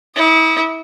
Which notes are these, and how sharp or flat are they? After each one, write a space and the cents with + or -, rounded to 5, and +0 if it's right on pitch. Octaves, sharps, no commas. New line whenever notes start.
E4 -35 D#6 -10